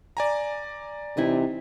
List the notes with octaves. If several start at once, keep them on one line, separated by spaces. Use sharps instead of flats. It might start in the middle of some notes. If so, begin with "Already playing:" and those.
D5 G#5 A#5
C3 E3 D#4 E4